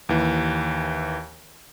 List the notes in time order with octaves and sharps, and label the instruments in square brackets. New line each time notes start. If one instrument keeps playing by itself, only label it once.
[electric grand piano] D#2 E3